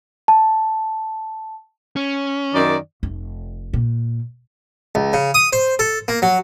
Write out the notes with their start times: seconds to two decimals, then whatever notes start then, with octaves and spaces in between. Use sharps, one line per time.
0.28 A5
1.96 C#4
2.53 F#2 D#3 D5
3.03 F1
3.73 A#2
4.95 C#2
5.13 C#3
5.34 D#6
5.53 C5
5.79 A4
6.08 A#3
6.22 F#3